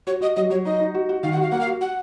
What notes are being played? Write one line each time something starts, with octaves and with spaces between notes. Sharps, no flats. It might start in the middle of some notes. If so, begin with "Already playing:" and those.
F#4 C#5
F#4 D#5
F#3 D#5
F#3 C#5
D#4 D#5
D#4
F#4
F#4
D#3 F5
F#5
F#4
F5
A#3 F#5
F5
F#4
F#4 F#5